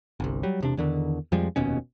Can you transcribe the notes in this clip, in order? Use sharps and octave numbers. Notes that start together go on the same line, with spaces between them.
G1 C2
F#3 G3
E1 C3 D4
E2 D3 D#3
F2 F3 G3 G#3
F1 D#2 B2 C#4